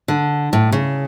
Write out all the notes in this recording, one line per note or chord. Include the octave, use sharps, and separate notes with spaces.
D3
A2
C#3